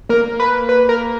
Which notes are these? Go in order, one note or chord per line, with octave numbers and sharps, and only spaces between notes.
A#3 A#4
B4
B4
A#4